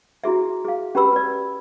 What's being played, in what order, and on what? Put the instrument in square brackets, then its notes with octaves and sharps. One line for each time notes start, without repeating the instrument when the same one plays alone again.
[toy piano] E4 F#4 G#4 E5
G#4 F5
C#4 G4 B4 B5 E6
B4 D5